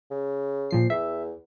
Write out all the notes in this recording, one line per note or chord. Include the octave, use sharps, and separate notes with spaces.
C#3
A#2 F3 C7
E2 E5